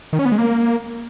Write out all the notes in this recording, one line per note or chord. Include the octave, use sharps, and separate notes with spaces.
D#3
C#4
B3
G#3
A#3